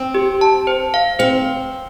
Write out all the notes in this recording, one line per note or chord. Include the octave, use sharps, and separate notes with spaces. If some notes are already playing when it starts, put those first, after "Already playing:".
Already playing: C4
G4
A5
C5
F5
C4 C5